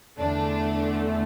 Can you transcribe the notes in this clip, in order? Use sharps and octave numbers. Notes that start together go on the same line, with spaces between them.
E2 D3 A3 D4